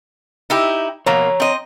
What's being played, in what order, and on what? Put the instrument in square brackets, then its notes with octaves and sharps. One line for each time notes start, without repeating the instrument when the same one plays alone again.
[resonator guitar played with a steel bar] D#4 E4 G4
[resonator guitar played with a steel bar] B2 A#3 [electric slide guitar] C#5 A#5
[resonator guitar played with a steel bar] C4 D#5